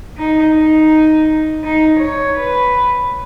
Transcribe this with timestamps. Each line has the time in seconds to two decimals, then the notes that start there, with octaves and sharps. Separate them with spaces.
0.18 D#4
0.55 D#4
1.63 D#4
1.99 C#5
2.37 B4